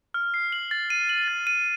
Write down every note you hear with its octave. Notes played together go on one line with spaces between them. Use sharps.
F6
C7
F#7
A6
D#7
F#7
A6
D#7